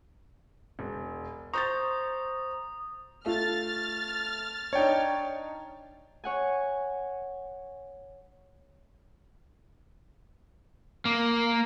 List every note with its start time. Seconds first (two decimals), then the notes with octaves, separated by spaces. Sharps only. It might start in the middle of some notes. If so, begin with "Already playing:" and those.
0.79 E1
1.54 C5 A#5 C#6 D#6 G6 A6
3.26 A3 F4 F6 A6
4.73 D4 D#4 C#5 G5
6.24 C#5 F#5 G#5
11.05 A#3